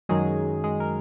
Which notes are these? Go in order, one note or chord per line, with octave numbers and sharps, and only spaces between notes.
F#2 D#3 F#3 G#3 G#4
G#3 G#4
A#4